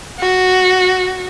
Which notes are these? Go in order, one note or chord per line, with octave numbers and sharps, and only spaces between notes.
F#4